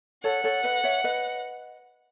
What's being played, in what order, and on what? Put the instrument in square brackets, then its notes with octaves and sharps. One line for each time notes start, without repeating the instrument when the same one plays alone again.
[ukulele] A4 C#5 [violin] F#5
[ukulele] A4 C#5
B4 D#5
C#5 E5
B4 D#5